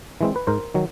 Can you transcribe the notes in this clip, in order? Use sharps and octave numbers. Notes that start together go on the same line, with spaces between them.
E3 G#3 C4
B4
G#2 A#4 C5
D#3 F#3